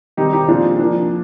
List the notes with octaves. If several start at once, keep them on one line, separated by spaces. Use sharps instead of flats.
D#3 G3 C4 D#4 G4
D#4 G4
A#2 F3 G#3 C4 D4 F4
F3 A#3 D4